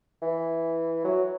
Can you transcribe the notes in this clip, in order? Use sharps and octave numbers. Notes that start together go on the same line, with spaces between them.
E3
F#3